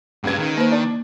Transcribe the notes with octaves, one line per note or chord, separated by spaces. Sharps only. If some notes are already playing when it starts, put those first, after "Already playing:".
C#2 G2 D4 B4 G#6
D#3
A#3 B4 C5
D4